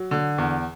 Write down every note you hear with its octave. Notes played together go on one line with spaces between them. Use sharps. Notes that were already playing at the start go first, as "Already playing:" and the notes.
Already playing: F#3
D3
E2